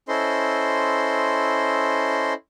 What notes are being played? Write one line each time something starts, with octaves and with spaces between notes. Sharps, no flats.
C#4 E4 A4 C5 D#5 C6